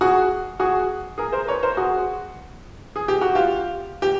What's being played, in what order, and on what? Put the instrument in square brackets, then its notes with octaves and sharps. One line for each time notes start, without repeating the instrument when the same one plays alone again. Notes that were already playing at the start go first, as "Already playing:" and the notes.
[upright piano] F#4 G#4
F#4 G#4
G#4 A#4
A#4 C5
B4 C#5
A#4 C5
F#4 G#4
G#4
G4
F#4
F4 G4
G4